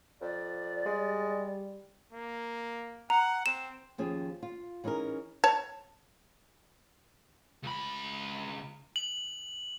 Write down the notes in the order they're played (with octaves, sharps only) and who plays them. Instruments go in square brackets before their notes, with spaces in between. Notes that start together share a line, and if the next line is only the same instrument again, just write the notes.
[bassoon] F2 [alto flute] D5
[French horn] G3 [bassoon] G#3
[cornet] A#3
[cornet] F#5 [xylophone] A#5
[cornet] C4 [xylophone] E7
[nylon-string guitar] D#2 F3 C#4 G4 G#4
F4
E3 C#4 D#4 G#4 A#4
[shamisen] C#5 A5
[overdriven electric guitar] C#2 B5
[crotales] F#7